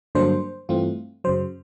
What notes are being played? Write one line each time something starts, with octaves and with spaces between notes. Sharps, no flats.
G2 D3 F#3 A#3 D4 C5
G2 E3 A3 C4 F4
F#2 C#3 F#3 C5